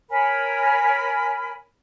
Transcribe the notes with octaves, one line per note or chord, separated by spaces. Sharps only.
A#4 C#5 G#5 B5